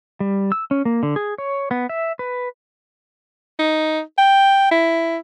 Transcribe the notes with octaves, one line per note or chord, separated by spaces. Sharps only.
G3
E6
C#4
A#3
D3
G#4
C#5
B3
E5
B4
D#4
G5
E4